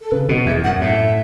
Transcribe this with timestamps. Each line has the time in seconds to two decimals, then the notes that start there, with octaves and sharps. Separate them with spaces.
0.01 A4
0.11 C#3 B4
0.29 B2
0.46 E2 E5
0.64 F#2 F#5
0.81 A2 E5